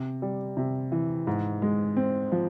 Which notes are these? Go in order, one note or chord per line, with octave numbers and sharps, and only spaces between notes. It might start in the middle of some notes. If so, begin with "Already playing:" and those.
Already playing: C3
G3
C3
E3
G#2
G#3
C4
F3